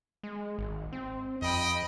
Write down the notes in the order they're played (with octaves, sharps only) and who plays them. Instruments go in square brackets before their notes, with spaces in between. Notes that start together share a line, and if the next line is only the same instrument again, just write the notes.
[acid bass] G#3
G#1
C4
[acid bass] F2 [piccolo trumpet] D#5 [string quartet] G5 B5